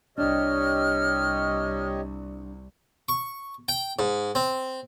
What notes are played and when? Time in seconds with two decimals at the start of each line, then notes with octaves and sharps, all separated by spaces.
0.18 C2 D4 G4 C#5 D#5 F6
3.09 C#6
3.68 G5
3.99 G#2
4.35 C4